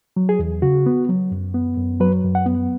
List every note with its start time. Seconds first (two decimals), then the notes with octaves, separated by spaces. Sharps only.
0.16 F#3
0.29 G#4
0.39 E2
0.62 C#3 F#4
0.86 B3
1.09 F#3
1.31 F#2
1.54 B3
1.77 F#2
2.00 F#3 B4
2.24 F#2
2.35 F#5
2.46 B3